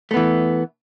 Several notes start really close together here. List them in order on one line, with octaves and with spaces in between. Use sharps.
A3 B3 E3